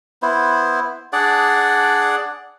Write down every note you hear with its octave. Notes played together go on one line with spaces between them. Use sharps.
B3 E4 C5
D4 G#4 D5 F#5